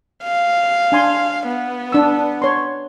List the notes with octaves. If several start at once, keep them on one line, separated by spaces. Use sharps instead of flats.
F5
D4 G#5 C6
B3
D4 E6
C#5 C6